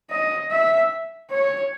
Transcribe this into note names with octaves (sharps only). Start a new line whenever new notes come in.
D#5
E5
C#5